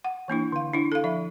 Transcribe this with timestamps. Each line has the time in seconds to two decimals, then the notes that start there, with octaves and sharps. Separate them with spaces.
0.04 F#5
0.28 E3 A#3 D4 E4
0.52 D3 F5
0.73 D4 E4
0.92 A4 F5
1.04 F3 E5 B5